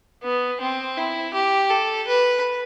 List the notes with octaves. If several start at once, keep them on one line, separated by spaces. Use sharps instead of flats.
B3
C4
E4
G4
A4
B4